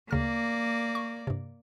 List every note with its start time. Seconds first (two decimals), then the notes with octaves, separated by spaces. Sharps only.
0.11 D2 C#3 A#3 D5 F6
0.95 C#6
1.27 G2 C3